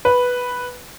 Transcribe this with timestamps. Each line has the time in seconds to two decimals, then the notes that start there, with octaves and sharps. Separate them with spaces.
0.05 B4